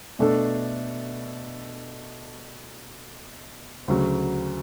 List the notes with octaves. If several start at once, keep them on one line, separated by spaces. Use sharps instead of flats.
B2 A3 D4 A4
D2 C#3 F#3